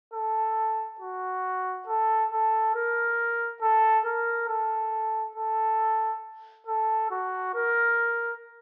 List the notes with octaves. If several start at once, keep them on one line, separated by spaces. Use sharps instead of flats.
A4
F#4
A4
A4
A#4
A4
A#4
A4
A4
A4
F#4
A#4